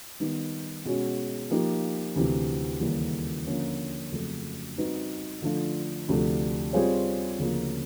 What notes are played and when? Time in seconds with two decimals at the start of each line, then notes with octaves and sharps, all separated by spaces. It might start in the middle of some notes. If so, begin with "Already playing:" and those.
0.20 D#3 G3 B3 D#4
0.85 B2 G#3 C#4 F#4
1.51 F3 A#3 D#4 G4
2.16 D2 C3 E3
2.81 D#2 C#3 E3 G3 A#3
3.47 D3 F3 A#3 C#4
4.12 F2 C#3 F#3 A3
4.78 G3 C4 D#4 F#4 B4
5.42 D3 F3 A3 D4 F4
6.08 D2 C3 F3 A3 D4
6.73 G3 C4 F4 G#4 C#5
7.38 D2 C#3 F3 A#3